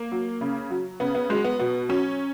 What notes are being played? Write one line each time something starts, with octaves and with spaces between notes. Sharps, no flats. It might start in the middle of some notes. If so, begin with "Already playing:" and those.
Already playing: A#3
F#3
C#3
F#3
C#3 B3
B3
F#3 G#3
B3
B2 B3
F#3 C#4